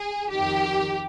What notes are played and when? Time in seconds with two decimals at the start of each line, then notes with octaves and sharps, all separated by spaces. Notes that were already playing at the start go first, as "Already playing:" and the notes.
Already playing: G#4
0.31 F2 D#3 G4